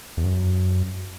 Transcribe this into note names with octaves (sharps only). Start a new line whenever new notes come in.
E2
F#2